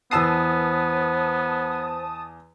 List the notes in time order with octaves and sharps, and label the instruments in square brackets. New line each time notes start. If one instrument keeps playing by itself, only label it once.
[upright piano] E2 E6 C7 [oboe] B3 [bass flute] C5 [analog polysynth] A5 D#6